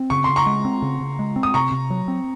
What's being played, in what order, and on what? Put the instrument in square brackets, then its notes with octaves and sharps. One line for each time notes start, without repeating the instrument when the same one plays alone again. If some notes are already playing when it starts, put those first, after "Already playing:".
Already playing: [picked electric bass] C4
[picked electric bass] C#3 [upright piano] C#6
[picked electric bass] C#3 [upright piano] C6
[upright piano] A#5 C#6
[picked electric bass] G#3
C4
C#3
C#3
G#3
C4
[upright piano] D#6
[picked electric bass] C3 [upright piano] A#5 C#6
[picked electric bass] C3
F#3
C4